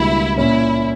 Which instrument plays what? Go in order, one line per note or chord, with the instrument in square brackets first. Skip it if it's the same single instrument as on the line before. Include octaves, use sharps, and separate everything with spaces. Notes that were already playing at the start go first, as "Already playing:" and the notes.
Already playing: [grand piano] C#2 B2 G3 A#3 D4 [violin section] E4
[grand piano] A#2 A#3 C#4 [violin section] E4